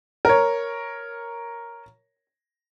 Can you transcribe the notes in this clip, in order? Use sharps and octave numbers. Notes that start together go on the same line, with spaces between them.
A#4 C#5